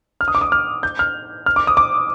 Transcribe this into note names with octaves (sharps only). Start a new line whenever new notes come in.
F6
D#6
D6
D#6
F6
G6
F6
F6
D6
D#6
D6